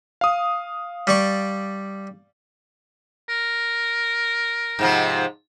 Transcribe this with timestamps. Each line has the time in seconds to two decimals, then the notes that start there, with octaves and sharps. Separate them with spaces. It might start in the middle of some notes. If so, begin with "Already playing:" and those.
0.21 F5 D#6
1.07 G3 D5 C#6
3.29 A#4
4.79 G#2 C3 F3